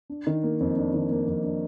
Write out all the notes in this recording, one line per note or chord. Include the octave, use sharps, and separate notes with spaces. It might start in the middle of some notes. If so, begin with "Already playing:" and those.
D4
D#3
A#3
F2
D4
D#3
A#3
F2
D4